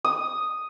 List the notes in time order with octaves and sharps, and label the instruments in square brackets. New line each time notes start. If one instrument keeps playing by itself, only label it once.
[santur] D#6